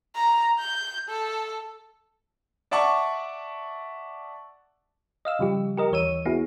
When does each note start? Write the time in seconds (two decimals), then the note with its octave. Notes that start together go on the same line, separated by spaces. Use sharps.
0.15 A#5
0.59 G6
1.09 A4
2.71 D5 E5 F#5 A5 C#6 D6
5.25 D#5 F5 E6
5.39 C#3 F3 G3 G4
5.77 G4 A#4 D#5
5.91 D#2 E3 C#5 E6 D#7
6.25 B3 E4 F#4 G#4